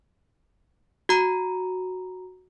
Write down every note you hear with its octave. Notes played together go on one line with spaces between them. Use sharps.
F#4 A#5